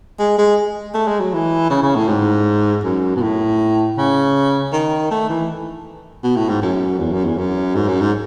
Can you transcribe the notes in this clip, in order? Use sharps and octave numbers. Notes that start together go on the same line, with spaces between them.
G#3
G#3
A3
G#3
F#3
E3
C#3
C#3
A2
G#2
F#2
B2
A2
C#3
D#3
A3
E3
B2
A2
G#2
F#2
E2
F#2
E2
F#2
G#2
F#2
G#2